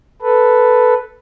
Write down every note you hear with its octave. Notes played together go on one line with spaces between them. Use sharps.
A4 B4